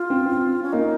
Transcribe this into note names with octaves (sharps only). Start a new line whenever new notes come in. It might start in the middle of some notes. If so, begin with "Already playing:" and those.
Already playing: F4
C4
C4
C#4
A#3 D#4